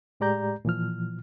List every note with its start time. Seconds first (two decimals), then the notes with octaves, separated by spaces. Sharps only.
0.20 A2 G#3 G4 D5 A#5 G6
0.65 A#2 E3 F3 F6